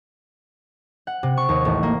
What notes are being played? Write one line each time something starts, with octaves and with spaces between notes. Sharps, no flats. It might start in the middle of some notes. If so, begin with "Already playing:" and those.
F#5
C3
C#6
D#2
A1
A#3